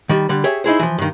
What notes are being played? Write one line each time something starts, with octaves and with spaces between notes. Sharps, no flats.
D#3 G3
D3 G3
G4 G#4 C#5 E5
D#4 E4 G#4 C5
E3 F3
G2 D#3